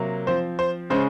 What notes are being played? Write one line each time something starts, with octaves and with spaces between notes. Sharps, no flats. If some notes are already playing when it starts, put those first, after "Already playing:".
Already playing: C3 F#3 A#3
F3 C4 C5
C5
C#3 G#3 C#4 C5